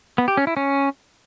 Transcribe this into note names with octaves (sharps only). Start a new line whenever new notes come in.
B3
G4
C#4
E4
C#4